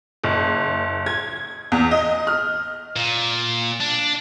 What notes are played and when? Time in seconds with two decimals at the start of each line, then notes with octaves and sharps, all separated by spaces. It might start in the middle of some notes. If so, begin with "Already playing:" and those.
0.24 F#1
1.06 G#6
1.72 E2
1.91 D#5
2.27 F6
2.96 A#2
3.81 D4